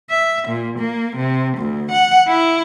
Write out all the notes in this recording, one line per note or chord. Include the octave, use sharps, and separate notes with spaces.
E5
A#2
A#3
C3
D2
F#5
E4